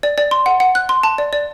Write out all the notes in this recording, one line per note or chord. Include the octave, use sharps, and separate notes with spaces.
D5
D5
C6
F#5
F#5
F#6
C6
A5
D5
D5